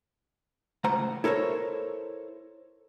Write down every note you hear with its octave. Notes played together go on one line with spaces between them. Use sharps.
C#2 A2 C5 F#5 A#5
E4 A4 A#4 C5 C#5